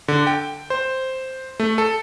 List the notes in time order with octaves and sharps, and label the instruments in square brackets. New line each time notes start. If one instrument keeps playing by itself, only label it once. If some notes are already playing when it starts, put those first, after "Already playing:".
[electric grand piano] D3
G5
C5
A3
A4